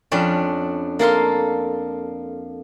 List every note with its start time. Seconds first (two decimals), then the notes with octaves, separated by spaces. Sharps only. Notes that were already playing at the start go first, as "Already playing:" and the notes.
0.12 F2 C#4 D4 D5
0.99 A#3 A4 F5 C6